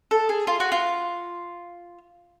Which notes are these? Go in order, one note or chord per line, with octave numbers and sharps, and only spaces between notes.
A4
G#4
F4
F#4
F4